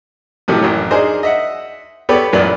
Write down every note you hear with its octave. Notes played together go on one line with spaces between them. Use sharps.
A2 C3 D#3 F3 F#3
A1 F#2
D4 D#4 G#4 A#4 C5 D#5
D#5 E5 F#5
B3 G4 A4 B4 C#5 D5
A1 F#2 A#2 B4 D5